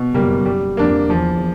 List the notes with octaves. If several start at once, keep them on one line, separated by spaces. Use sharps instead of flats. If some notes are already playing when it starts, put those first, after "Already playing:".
Already playing: B2
F#1 F#2 G3 A#3
G3
F2 A#3 D4
E2 F3